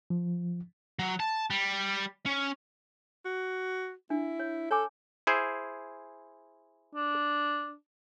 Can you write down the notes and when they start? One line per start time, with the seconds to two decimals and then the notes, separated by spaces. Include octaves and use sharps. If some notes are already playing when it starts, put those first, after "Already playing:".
0.10 F3
0.99 F#3
1.20 A5
1.50 G3
2.26 C#4
3.25 F#4
4.10 D4 E4
4.39 C#5
4.71 A4 C#5 G#5 D6
5.27 E4 G#4 C5
6.95 D4